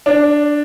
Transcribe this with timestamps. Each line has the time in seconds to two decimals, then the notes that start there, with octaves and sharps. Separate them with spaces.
0.06 D4